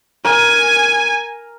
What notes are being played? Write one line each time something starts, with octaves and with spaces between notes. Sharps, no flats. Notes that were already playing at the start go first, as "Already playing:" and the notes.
A#4 G#5